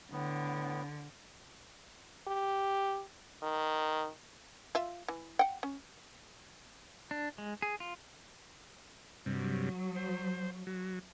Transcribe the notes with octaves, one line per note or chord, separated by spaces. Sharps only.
A2 D3 B3
G4
D#3
F4 E5
E3
F#5 G5
C#4
D4
G#3
G#4
F4
G2 C3 F#3
C5
F#3